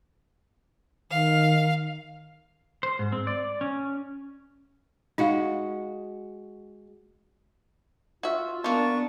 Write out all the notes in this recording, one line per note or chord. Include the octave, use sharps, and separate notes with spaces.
D#3 F5
C5
G#2
C4
D5
C#4
G#3 D#4 F#4 F5
F4 F#4 E5
A#3 B3 D4 F4 A5 C#6